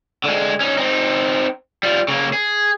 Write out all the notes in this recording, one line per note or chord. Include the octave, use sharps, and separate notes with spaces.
D3 G#3
C#4 D#4
C4 D#4
G3 F4
C#3 A#3
G#4